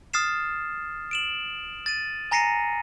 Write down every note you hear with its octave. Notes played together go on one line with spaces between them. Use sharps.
D#6 F6 A6 C7 E7
D7 E7 F#7
A6 D#7
G#5 A#5 A#6 C7 C#7 D#7